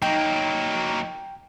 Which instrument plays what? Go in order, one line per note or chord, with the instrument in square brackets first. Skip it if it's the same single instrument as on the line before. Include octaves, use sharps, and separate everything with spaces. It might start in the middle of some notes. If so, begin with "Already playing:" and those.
[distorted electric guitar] F#3 A#3 [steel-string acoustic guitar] D#4 [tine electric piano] G5